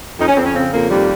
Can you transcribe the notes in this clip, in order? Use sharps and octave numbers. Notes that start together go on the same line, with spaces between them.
F2 D#4
C#4
F2 C4
C#4
C#3 C4
F2 A#3
D#2 G3